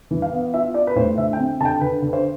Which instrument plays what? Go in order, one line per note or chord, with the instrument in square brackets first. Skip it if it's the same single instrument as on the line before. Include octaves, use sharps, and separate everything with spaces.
[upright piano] E3
F5
B3
F4 E5
F4 D5
B4
A2 C5
D3 E5
G5
C4
D3 A5
G5
D3 B4
D3
B4
C5